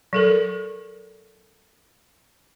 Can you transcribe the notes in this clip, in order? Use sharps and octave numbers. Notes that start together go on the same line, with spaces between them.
F#3 A4 A#4